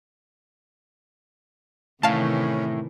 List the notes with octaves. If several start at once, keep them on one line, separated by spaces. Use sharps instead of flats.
A2 C3 D#3 E3 C#4 F5 A5